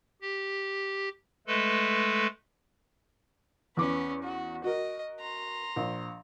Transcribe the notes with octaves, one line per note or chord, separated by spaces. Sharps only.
G4
G#3 A3 A4 B4
E2 C#4 B4 D6
F#4
F#4 A#4 D#5
A#5 C6
A#1